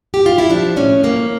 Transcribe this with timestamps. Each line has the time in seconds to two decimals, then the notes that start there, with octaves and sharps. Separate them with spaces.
0.14 G4
0.26 F4
0.38 E4
0.50 F3 D4
0.76 A2 C#4
1.03 F3 A#3